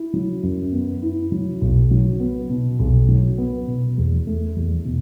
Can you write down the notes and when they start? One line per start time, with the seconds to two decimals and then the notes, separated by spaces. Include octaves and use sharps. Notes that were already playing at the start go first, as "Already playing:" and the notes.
Already playing: E4
0.14 F#3
0.43 F#2
0.72 B3
1.02 E4
1.32 F#3
1.62 B1
1.91 F#3
2.20 B3
2.50 B2
2.80 B1
3.09 F#3
3.38 B3
3.68 B2
3.98 E2
4.27 A3
4.57 E2
4.85 B2